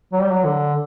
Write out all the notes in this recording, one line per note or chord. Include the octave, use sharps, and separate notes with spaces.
F#3
G3
F#3
D3